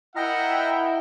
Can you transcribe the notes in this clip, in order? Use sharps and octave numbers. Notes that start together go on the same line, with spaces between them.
E4 A#4 D#5 E5 F#5 G5 A#5 F6